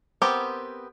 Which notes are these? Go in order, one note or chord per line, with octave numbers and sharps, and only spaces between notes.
B3 C4 G4 A#4